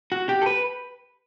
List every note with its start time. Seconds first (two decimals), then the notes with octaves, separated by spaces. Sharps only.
0.12 F#4
0.29 G4
0.42 A4
0.46 B4